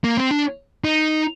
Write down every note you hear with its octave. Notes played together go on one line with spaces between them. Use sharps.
A#3
C4
D4
D#4